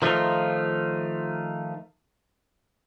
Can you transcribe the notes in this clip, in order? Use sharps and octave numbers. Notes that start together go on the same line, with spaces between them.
D#3 F3 A3 D#4 F4